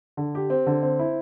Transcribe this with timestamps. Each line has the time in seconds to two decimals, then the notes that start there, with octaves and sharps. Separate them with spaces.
0.17 D3
0.35 G4
0.50 C4
0.66 D3
0.83 C4
0.99 E4